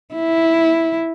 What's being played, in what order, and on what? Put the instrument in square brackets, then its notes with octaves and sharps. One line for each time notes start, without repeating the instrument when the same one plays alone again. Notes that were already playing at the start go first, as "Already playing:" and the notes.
[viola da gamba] E4